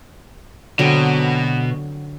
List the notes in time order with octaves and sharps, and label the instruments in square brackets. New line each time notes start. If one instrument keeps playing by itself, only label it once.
[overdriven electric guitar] B2 [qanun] D3 F#3 C4